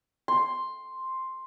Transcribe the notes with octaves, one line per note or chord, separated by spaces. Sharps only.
C6